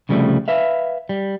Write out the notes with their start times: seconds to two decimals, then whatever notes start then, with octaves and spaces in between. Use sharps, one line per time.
0.09 C2 C#3 F3 G3 A3
0.48 B4 E5 F5
1.09 G3